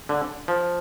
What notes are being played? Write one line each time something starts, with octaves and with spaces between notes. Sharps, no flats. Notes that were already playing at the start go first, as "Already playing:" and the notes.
D3
F3